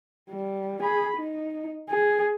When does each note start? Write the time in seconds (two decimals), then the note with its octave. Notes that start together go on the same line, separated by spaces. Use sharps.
0.30 G3
0.83 G#4 B5
1.17 D#4
1.89 G#4